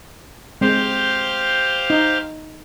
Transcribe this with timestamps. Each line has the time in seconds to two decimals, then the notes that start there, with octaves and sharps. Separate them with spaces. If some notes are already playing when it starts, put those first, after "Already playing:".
0.61 G#3 C4 G4 C5 F5
1.90 D#4